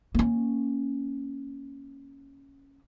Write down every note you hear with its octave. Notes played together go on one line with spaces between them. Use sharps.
A#3 C#4